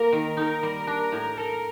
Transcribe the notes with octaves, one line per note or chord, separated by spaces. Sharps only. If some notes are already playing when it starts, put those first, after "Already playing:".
Already playing: A#3 A#4
D#3
D#4 A#4
G3
D4
A2
A4 A#4